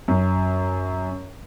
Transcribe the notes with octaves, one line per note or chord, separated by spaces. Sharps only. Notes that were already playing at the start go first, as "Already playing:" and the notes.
F#2